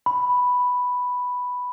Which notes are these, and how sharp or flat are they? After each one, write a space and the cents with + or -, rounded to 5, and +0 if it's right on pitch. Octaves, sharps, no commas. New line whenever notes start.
B5 +0